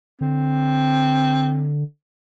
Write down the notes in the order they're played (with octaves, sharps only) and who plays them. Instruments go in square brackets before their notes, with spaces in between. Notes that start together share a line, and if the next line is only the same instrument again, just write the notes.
[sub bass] D3 [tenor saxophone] C4